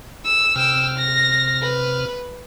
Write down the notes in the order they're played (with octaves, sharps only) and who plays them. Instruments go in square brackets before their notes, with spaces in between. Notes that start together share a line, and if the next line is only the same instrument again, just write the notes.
[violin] E6
[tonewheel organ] C3 F6 [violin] G5 E6
[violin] A#6
B4